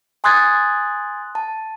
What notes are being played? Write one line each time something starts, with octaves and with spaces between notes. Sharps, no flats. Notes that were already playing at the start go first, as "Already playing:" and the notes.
G#5 C6 D#6 F#6 G#6 A6
A5